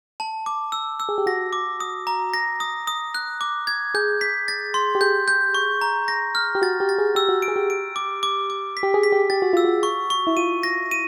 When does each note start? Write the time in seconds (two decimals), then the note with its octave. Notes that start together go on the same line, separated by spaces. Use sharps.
0.20 A5
0.46 D6
0.72 E6
1.00 E6
1.09 G#4
1.18 G4
1.26 F#4 A#6
1.53 D6
1.80 D#6
2.07 A#5
2.34 A#6
2.60 D#6
2.87 D#6
3.15 F#6
3.41 D6
3.67 G#6
3.94 G#4 G6
4.21 B6
4.48 A6
4.74 C6
4.95 G4
5.01 G#4 G6
5.28 G6
5.54 C#6
5.81 A#5
6.08 A#6
6.35 F6
6.55 G4
6.62 F#4 A6
6.80 G4
6.89 A6
6.98 G#4
7.15 G4 E6
7.29 F#4
7.42 D7
7.48 G#4
7.56 G4
7.70 D7
7.96 D6
8.23 D6
8.50 D6
8.77 B6
8.83 G4
8.94 G#4
9.03 B6
9.12 G4
9.30 G4 A6
9.42 F#4
9.53 F4 E6
9.65 F#4
9.83 C#6
10.10 C#6
10.27 E4
10.37 F4 D#7
10.63 A#6
10.91 D#7